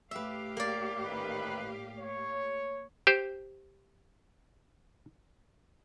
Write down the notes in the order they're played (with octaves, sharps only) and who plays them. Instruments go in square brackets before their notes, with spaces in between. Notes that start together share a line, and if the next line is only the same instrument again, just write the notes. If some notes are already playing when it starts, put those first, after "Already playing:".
[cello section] A2 G4 F5 [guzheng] B4 E5
[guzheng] A#3 D5
[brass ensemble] A1 D#3 B4
C#5
[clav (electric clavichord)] G4 C5